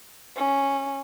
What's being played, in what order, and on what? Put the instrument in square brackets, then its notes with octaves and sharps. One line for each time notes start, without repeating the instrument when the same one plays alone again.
[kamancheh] C#4